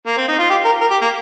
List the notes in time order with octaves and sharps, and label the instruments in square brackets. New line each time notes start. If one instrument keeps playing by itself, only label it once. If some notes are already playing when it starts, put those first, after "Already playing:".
[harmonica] A#3
C4
D#4
F4
G4
A#4
A#4
G4
A#3